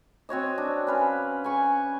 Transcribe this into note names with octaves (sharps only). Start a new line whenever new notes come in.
C4 F#4 C#5 D#5
D4
C#4 B4 F5
G#5 B5 C#6